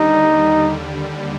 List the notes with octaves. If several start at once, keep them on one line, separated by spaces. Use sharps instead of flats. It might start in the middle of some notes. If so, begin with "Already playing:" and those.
Already playing: D#2 D3 G3 D#4